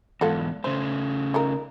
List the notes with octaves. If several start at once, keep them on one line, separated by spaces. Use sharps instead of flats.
E2 G#2 F4 A4 F#5
C#3 A3 C5
D#3 F4 A#4